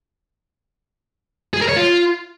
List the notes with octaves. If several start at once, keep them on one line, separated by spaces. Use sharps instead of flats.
G#4
A#4
C#5
F4